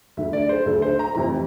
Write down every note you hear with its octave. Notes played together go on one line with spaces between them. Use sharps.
D2 D3 A3 E5
D5
C5
D2 D3 A3 A4
C5
A#5
F1 F2 C3 E3 A#5